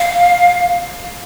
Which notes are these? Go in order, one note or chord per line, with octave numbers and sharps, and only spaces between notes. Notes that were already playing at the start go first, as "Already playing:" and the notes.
Already playing: F5